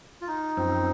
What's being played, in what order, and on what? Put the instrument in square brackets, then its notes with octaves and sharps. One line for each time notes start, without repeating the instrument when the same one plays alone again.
[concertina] F4
D#4
[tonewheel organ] F#2 F3 C4